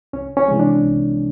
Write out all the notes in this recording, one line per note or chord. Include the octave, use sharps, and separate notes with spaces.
C2 C#4
C#4
C3 E3 G#3
D4
C2